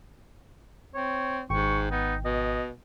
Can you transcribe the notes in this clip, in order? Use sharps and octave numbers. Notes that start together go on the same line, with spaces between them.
C4 C#5
G#1 G#2 G5 C#6
B3 D#4
B2 D#5